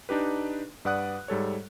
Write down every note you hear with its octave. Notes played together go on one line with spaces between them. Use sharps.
D4 D#4 G4 B4
G2 B4 D5 F#5 D#6 F#6
G#2 G3 A4 C#5